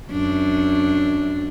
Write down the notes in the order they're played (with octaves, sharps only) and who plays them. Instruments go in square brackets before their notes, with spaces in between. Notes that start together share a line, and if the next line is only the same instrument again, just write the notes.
[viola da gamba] F#2 D4